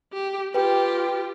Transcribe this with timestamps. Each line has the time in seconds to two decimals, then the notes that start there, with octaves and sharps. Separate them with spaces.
0.13 G4
0.54 F4 G4 B4 G5